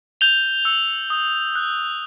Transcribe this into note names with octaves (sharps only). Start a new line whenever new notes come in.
G6 F7 G7
E6
D#6
F#6